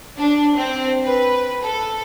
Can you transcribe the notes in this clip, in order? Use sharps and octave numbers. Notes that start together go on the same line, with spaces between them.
D4
C4
B4
A4